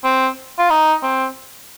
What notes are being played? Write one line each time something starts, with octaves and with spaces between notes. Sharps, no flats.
C4
F4
D#4
C4